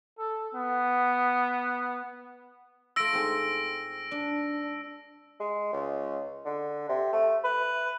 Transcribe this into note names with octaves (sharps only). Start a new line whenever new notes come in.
A4
B3
A3 F4 E6 A#6 D7
G#2 C4 G#4
D4
G#3
C#2
D3
C3
A3
B4